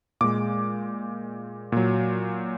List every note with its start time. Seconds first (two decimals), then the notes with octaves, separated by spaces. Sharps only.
0.21 A#2 G#3 D6
1.72 A#2 F#3